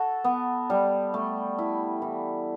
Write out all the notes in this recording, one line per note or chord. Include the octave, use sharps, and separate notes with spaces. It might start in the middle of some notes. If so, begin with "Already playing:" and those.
Already playing: F#4 A4
B3
G3
A3
E4
E3